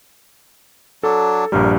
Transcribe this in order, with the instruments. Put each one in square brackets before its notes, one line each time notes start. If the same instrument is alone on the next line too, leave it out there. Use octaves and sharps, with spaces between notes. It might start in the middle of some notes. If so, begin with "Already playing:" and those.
[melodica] F#3 D4 [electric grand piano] A4
[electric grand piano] A#1 G2 G3 [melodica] A#4